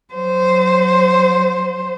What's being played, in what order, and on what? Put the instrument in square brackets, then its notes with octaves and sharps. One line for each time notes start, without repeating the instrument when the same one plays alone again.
[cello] F#3 C5